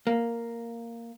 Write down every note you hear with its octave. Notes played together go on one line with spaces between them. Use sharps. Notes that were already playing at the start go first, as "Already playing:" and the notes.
A#3